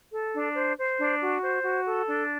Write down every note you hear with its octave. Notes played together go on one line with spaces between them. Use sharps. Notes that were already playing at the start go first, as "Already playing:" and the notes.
A4
D4
C5
C5
D4
F#4
C5
F#4
A4
D4